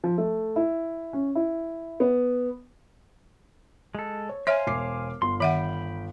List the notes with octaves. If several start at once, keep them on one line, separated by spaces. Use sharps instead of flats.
F3
A3
E4
C#4
E4
B3
G#3 A4
C#5
C5 C#5 E5 F5 G#5 F6
E1 D6 C7
G1 C6
D#3 E5 F#5 G5 B5